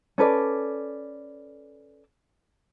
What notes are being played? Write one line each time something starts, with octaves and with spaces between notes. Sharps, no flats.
C#4 A4 B4 D5